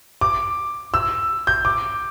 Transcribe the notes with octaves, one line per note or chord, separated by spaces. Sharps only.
D6
E6
G6
D6